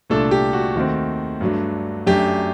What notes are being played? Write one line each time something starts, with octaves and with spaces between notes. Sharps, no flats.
C2 A#2 A3 D4 A4
G4
F#4
D#2 D#3 A3 C4
G2 F#3 A3 D4
F#2 F#3 A3 D4 G4